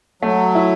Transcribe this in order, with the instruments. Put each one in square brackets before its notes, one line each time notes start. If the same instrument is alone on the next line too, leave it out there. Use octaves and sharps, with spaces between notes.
[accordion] F#3 [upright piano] A3
[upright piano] E4